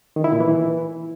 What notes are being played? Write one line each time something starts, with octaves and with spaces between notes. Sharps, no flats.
D#3
E4
A#2
E3